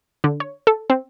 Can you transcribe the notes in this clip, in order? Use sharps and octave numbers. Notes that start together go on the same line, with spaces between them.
D3
C#5
A4
C4